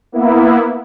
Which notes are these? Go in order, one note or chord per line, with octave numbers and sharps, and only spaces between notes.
A#3 B3 E4